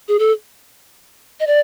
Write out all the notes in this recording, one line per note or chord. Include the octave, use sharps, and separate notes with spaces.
G#4
A4
D#5
D5